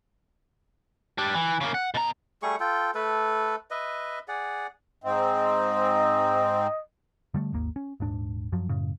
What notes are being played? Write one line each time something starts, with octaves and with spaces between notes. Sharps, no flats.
G3 D4
E3
C#3 A#3
F#5
B2 A#5
G3 A3 G#4 C#6
F4 A4 G5
A3 A4 B4
B4 D#5 E5
G#4 D5 F#5
G#2 C4 D#5
D3 G3 A3
G#1 D#2 A#3
C#4
D#1 G#2 D4
F#2 F3 F#3
F#2 A2 C#3